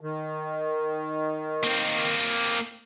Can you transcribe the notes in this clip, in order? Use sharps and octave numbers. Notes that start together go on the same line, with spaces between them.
D#3
A#3 C4